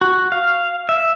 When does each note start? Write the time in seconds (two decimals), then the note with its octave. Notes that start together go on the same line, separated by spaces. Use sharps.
0.01 F#4
0.32 F5
0.89 E5